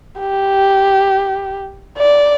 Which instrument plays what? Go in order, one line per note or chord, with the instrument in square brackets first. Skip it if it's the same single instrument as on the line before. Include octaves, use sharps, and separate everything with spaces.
[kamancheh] G4
D5